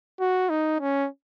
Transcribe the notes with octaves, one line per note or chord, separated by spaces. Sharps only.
F#4
D#4
C#4